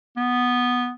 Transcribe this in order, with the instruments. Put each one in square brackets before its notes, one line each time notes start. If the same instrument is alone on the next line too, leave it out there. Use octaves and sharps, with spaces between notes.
[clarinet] B3